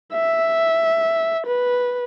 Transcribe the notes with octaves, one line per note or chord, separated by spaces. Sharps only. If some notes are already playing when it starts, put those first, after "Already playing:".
E5
B4